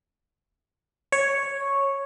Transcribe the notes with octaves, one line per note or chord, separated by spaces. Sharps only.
C#5